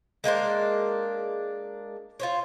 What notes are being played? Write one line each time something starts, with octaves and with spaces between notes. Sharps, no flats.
G#3 A#3 D4 C5
F4 C5 C#5